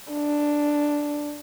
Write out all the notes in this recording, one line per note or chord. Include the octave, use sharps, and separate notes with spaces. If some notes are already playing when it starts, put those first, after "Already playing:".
D4